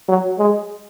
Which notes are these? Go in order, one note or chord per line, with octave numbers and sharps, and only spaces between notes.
F#3
G#3